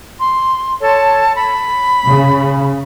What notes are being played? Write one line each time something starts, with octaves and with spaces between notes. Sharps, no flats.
C6
A4 C#5 A5
B5
C#3